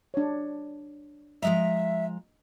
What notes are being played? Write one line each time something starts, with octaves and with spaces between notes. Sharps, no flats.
D4 C#5
F3 G#3 D#5 E5 A#5